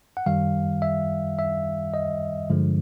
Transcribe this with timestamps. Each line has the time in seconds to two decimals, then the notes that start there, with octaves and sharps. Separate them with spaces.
0.17 F#5
0.26 F#2 D#3 G3 F5
0.82 E5
1.39 E5
1.94 D#5
2.50 G2 D3 F3 G#3